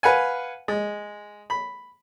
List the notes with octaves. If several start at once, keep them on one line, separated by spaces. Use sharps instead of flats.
B4 F5 F#5 G#5
G#3
B5